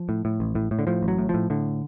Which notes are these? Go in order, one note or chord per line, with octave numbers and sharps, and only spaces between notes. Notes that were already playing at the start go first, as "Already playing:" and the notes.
Already playing: F3
A2
A2
A1
A2
A2
D3
A2 F3
A1
F#3
A2
A2 F3
A2 D3